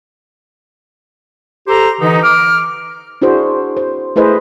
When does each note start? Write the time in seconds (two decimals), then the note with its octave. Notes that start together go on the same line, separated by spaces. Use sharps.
1.68 G4 A4 C5 A#5
2.01 D3 E3 D#4
2.23 D6 F6
3.22 D4 E4 F#4 G#4 C5
3.77 C5
4.16 A3 E4 G#4 B4 C5 D#5